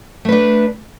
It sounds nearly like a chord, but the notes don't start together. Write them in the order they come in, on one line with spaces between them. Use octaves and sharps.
A3 B4 D4